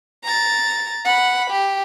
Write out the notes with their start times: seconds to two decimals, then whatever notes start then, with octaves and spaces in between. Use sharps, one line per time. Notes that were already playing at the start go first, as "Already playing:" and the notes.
0.24 A#5 A6
1.04 F#5 B5
1.50 G4